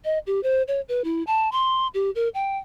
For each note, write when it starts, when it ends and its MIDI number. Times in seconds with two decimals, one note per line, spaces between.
0.05 0.19 75
0.27 0.42 67
0.43 0.63 72
0.68 0.81 73
0.89 1.02 71
1.04 1.23 64
1.27 1.49 81
1.52 1.87 84
1.94 2.10 67
2.15 2.29 70
2.34 2.58 79